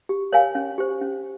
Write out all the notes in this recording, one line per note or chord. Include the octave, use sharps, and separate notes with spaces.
G4
A#4 C#5 F5 G#5
C#4
G4 C5
C#4